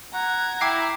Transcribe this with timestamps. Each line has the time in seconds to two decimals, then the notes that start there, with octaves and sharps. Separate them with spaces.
0.14 F#5 A#5 G#6
0.61 E4 G5 D6 C7